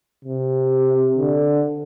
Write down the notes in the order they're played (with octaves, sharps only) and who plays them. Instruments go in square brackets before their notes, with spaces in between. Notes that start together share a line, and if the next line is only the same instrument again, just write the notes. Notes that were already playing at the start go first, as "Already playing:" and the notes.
[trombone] C3
D3